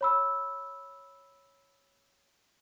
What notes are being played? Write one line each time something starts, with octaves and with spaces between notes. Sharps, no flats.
C#5 B5 E6